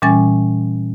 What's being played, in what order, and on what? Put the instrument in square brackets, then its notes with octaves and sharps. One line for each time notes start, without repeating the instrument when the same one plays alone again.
[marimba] A#2 E3 G3 C#4 G#5 A6